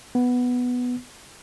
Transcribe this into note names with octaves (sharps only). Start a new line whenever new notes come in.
B3